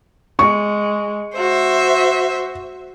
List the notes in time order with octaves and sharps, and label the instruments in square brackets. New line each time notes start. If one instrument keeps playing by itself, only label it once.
[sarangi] G#3 [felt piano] C#6
[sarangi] F#4 [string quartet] C5 E5